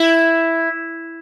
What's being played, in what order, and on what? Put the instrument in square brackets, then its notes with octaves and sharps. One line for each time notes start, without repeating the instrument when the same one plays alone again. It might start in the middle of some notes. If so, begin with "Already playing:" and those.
Already playing: [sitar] E4